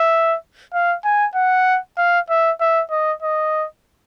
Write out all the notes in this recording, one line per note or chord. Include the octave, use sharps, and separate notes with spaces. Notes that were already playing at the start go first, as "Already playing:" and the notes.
Already playing: E5
F5
G#5
F#5
F5
E5
E5
D#5
D#5